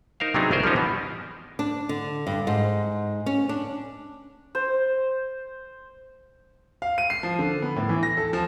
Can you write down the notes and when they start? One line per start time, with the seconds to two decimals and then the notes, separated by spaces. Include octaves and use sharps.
0.20 D#4 A#4 C5 F5
0.34 C3 F#3 B3 D4 D#4 G#4
0.51 C2 F4 G#4 A#4 C5
0.63 F3 G3 B3 C#4 D#4 G4
0.76 B2 E3 B3
1.59 D4
1.89 D3
2.27 G2
2.47 G#2
3.26 C#4
3.49 D4
4.55 C5
6.82 F5
6.98 D#7
7.10 C7
7.23 F3
7.39 D3
7.62 B3
7.76 A2
7.89 E3
8.03 A#6
8.17 A4
8.33 F3